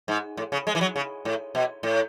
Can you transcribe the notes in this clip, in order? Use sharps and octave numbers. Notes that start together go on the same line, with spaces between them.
G#2
A2
C#3
G#3
E3
F#3
C#3
A2
B2
A2